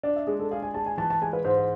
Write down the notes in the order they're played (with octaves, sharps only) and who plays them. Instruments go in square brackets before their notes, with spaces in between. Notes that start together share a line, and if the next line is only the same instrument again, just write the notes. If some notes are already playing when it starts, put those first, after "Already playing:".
[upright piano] D4 [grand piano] D5
[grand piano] E5
[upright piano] G#3 [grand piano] G#4
[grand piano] A4
[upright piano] G#4 [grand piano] F5
[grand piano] G#5
[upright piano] G#3 [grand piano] A5
[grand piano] G#5
[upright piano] E3 [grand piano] A5
[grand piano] A5
[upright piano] G#3 [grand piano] G#5
[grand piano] B4
[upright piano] G#2 [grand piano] C5
[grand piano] C5